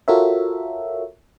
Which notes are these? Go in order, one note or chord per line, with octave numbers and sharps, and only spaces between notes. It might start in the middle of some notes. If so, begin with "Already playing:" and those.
F4 F#4 A4 A#4 C#5 E5